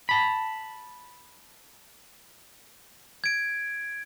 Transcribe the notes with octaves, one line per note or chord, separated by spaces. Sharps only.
A5 B5
G#6 D7